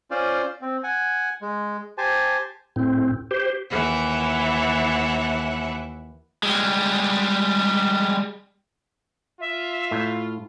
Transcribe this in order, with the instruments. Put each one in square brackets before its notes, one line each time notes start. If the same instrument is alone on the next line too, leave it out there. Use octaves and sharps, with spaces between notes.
[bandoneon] C#4 F4 C5 D5
C4
F#5 G#5
G#3
G4 C5 G#5 A5
[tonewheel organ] A2 C4
G4 C5
[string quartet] D#2 E3 E5 F#5
[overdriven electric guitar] G3 G#3
[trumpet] F4 [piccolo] E5
[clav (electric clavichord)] A2